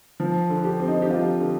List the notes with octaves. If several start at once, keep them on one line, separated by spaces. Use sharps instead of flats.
F3
D3
G4
C4
D#4
G4
F3 F4
D3